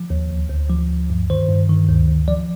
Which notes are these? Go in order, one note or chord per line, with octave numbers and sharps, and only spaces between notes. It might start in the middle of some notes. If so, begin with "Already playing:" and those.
Already playing: F3
D#2
D2
D2
F3
D2
G2
D#3 C5
G2
D#3
D2
D2
F3 D5